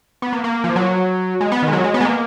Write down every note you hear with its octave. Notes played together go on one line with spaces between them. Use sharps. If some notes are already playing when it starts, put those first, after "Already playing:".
B3
A#3
A#3
F3
F#3
G#3
B3
D#3
G#3
F#3
G#3
B3
G#3
A#3